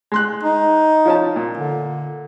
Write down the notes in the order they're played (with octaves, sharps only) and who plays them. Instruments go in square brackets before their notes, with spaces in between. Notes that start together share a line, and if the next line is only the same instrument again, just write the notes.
[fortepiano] G#3 C6 F#6
[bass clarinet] D#4
[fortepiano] F3 C#4 A5
A#2
[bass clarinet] D3